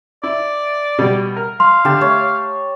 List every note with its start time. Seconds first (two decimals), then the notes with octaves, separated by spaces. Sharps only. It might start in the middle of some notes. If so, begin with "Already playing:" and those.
0.24 E4 D5
0.99 B2 G3
1.36 A#4
1.60 F5 C6
1.85 D3 G4 A5
2.01 A3 C#5